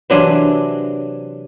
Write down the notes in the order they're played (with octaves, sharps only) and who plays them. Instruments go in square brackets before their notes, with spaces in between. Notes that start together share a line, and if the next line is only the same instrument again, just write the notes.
[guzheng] C3 E3 F#3 D4 G#5 C6